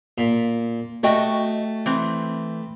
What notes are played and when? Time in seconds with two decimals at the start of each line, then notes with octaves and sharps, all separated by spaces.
0.18 A#2
1.03 A3 F#4 D#5 G5
1.86 E3 C4